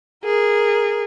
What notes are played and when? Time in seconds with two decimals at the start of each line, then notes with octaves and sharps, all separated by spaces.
0.24 G#4 A#4